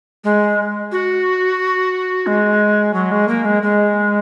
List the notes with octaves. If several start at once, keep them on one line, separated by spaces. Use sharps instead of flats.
G#3
F#4
G#3
F#3
G#3
A#3
G#3
G#3